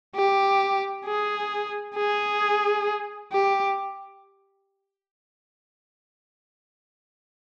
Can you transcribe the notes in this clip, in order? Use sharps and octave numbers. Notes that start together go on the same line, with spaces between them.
G4
G#4
G#4
G4